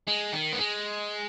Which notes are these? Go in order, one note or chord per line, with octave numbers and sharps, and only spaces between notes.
G#3
D#3
B3
G#3